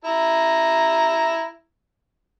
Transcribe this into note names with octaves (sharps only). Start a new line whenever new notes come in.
E4 A#5